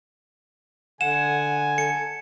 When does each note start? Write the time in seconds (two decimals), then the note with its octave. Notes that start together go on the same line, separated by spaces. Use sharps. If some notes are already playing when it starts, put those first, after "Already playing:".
1.01 D3 F#5 G#5 E7
1.78 A4 C#7